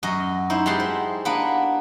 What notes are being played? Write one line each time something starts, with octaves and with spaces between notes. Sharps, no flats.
F#2 F#4 D#5
D#4 E4 C5
G#3 B3 G4 F#5 A5 C6
C5
A#3 B3 D4 B4